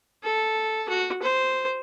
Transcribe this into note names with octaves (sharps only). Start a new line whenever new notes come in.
A4
F#4
C5